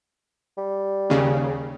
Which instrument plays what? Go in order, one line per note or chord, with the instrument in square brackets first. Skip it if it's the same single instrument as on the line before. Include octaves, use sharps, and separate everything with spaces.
[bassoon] G3
[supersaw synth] D#2 C#3